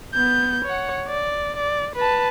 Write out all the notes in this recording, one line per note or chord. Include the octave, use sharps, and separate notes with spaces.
B3 G6
C#5 F#5
D5
D5
B4 A5